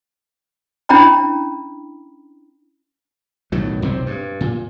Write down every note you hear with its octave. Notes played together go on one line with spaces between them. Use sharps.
C#4 D4 E4 G5 A#5 B5
B1 A2 D#3 F#3
B1 C3 C4
G2
A#2